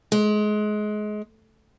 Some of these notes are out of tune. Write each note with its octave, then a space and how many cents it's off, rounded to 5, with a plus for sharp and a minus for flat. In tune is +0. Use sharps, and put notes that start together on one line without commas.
G#3 +25